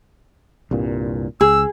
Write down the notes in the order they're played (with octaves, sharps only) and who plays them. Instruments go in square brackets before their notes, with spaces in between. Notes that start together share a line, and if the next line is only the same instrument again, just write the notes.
[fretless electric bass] C2 G2 A#2
[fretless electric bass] C#2 [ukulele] G#4 [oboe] E6